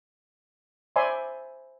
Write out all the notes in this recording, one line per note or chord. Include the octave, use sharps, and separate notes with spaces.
C5 D5 E5 G#5 B5 C6